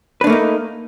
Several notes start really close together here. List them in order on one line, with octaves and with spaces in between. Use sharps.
B4 D4 A3 A#3 D#4